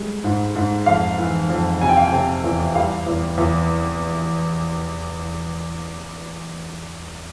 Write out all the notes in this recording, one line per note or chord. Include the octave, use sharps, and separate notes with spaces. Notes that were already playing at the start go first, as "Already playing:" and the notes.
Already playing: G3 G#3
G#2
G#2
F2 F5
E3
F2
C3 G#5
G5
F5
G5
C3
E2
G3 F5
E2
E2